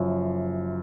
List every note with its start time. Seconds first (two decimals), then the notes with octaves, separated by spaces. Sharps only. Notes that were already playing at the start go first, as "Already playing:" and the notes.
Already playing: F#1 F#2 F3